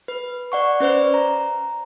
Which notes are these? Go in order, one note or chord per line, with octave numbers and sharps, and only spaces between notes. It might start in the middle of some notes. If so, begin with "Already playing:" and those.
B4
D5 F#5 C#6
C#4 B4 C5 D5
A#5